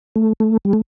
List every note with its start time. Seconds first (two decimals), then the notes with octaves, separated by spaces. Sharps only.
0.16 A3
0.40 A3
0.65 G3
0.73 A3